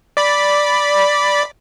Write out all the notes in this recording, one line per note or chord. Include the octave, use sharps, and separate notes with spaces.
D5 B5